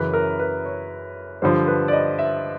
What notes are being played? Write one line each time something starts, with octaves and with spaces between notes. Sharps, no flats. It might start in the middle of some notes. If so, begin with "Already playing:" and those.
Already playing: F#2 C#3 E3 B4
A#4
B4
C#5
G2 D3 F3 C5
B4
D5
D#5
E5